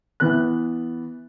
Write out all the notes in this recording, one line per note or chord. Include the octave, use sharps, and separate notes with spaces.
E3 B3 B4 F#6